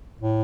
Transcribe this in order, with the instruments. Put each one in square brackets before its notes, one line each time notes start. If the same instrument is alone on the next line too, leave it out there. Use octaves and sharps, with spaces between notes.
[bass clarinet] A2